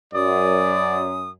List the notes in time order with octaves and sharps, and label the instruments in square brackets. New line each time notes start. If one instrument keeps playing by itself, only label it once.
[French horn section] F#2 [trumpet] D5 [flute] D#6